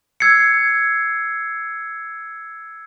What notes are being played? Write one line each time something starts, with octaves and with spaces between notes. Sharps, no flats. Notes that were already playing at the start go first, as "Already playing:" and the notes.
E6 G#6 C7 C#7